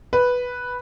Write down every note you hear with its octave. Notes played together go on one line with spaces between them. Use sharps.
B4